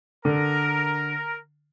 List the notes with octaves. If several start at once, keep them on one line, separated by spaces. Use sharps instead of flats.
D3 A#4